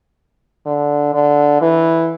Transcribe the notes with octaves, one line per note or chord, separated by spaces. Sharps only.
D3
D3
E3